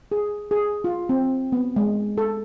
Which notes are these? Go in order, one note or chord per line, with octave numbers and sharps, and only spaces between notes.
G#4
G#4
F4
C4
B3
G#3
A4